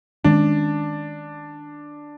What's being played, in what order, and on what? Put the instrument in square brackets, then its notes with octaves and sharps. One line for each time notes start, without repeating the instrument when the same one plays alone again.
[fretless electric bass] D#3 G#3 C#4 [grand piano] D4